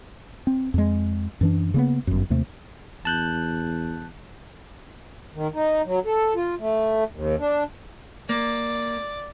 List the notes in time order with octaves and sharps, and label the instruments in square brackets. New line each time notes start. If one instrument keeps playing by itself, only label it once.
[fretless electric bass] C4
F2 G#3
F#2 E3 D4
C#3 A#3 B3
G1 F#2
D#2 C3 A3
[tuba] E2 [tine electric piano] A5 F#6 G6
[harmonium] D#3
D#4
F#3
A4
F4
A3
D#2
D4
[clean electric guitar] A#3 [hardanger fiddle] D5